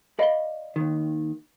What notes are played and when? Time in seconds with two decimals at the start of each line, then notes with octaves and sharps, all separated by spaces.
0.19 D5 D#5 F5 B5 G7
0.76 D#2 D#3